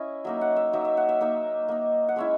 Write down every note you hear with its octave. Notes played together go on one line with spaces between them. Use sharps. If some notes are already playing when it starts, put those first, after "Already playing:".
Already playing: C#4 E4 D#5
F#3 A#3 D#4 E5
F#5
E5
F#3 A#3 D#4 E5
E5
F#5
E5
A#3 D#4 E5
A#3 D#4
F#5
G#3 C#4 E4 E5